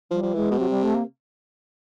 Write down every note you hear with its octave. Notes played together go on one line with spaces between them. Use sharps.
F3 G3
F3
E3 G#3
B2
C3 F#3
G3
A3
A#3